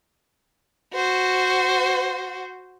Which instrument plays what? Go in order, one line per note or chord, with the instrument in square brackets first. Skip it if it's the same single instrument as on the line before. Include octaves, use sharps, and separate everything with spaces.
[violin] F#4 C5